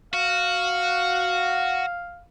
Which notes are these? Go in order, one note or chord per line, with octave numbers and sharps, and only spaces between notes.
F#4 F5